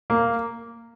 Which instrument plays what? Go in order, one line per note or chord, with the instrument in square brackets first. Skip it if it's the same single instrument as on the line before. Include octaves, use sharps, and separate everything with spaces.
[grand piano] A#3